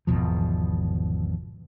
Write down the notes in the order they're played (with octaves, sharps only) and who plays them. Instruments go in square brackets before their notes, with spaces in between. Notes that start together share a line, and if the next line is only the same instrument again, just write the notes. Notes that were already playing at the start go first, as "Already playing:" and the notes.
[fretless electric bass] G#1 E2 B2 F3